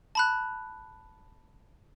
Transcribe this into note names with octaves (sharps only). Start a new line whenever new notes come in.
A5 B5 F#6